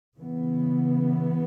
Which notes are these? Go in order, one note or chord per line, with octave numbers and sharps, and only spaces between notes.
C#3 E3 B3